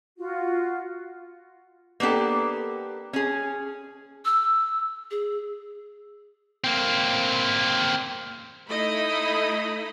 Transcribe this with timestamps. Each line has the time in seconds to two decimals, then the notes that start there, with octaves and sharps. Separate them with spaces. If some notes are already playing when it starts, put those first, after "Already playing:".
0.19 F4 F#4 F#5
2.00 A#3 B3 D4 G4 A4
3.13 C#4 G#4
4.25 E6
5.11 G#4
6.64 A#3 C4
8.68 A3 D#4 E4 D#5 B5